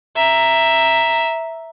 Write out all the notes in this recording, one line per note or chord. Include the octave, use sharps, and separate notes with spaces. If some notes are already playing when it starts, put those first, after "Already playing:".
E5 A#5